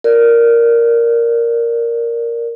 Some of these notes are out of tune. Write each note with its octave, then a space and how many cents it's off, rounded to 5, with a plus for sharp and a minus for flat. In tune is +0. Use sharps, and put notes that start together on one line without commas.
A#4 +0 D5 +0